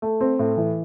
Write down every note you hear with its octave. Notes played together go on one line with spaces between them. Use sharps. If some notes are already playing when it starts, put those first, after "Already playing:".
A3
C4
A2
E3